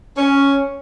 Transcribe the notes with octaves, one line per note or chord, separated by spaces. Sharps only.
C#4